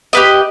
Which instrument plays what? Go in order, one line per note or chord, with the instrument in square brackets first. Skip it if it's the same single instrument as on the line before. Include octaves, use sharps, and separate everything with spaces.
[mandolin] G4 B4 D#5